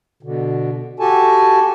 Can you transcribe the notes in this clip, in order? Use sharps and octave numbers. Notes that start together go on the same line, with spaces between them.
B2 D3
F#4 G4 A4 G#5 A5